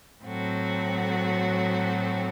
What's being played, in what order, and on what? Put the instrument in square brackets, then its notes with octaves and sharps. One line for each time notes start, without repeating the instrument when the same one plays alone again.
[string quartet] A2 F#3 C4 F#4 A4